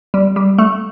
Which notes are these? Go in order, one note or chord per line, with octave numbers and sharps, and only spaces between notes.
G3
G3
A3